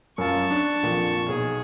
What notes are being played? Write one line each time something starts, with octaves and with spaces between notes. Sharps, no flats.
F#2 F4 A5 C#6
D4
A#1 F2 A#2
B1 G#4